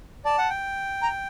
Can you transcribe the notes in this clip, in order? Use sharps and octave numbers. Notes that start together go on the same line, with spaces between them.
D5 A5
F#5
G5
A#5